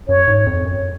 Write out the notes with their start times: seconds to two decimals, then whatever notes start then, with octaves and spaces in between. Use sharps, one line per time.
0.08 F#2 C#5
0.28 G#2
0.46 F2
0.65 F#2